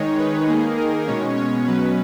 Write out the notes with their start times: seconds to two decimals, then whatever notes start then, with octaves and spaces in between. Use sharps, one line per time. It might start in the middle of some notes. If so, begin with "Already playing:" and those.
Already playing: D#3 G#3 D#4 C#5
0.18 B4
0.47 D#3 A#3 D#4 G#4
0.77 A#4
1.07 B2 G#3 C#4 C#5
1.37 C#5
1.66 B2 F#3 C#4 B4